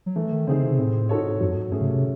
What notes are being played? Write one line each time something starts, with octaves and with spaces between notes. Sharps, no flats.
F#3
E3 A3
D#3
C#3 C4 D#4 G#4 C5
C3
A2 C4
G#2 D#4 F#4 A4 C#5
F#2 F#3
G#2
G#2 A3 C#4 G#4
C#3
C3